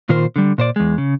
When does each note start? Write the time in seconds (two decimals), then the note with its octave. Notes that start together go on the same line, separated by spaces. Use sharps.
0.09 A#2 D#3 F4 A#4 C5
0.36 D3 G3
0.58 A#2 C5 D5
0.76 E2 G#3
0.98 C#3